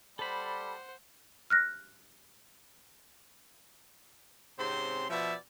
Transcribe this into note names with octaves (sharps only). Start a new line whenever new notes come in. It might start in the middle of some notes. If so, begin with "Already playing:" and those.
G3 A4 C5 F#5 B5
F6 F#6 A#6
G#2 C3 C4 C#4 C5 C6
B2 F3 F4 D5 E5